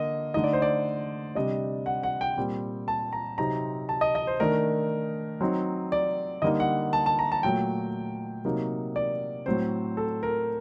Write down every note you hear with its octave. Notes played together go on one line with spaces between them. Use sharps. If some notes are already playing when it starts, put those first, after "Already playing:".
Already playing: D3 A#3 D#5
D3 A3 D#4 D#5
D5
C5
D5
C3 G3 D4 D#5
F#5
F#5
G5
A#2 G3 C4
A5
A#5
C3 F#3 C4 D#4 A#5
A5
D#5
D#5
C5
D#3 A3 D4 A#4
F#3 C4 D#4
D5
D3 G3 A#3 D#4 D#5
F#5
A5
A5
A#5
A5
A#2 F#3 A3 G5
C3 F#3 A#3 D#4
D5
A2 F#3 C4 C5
A4
A#4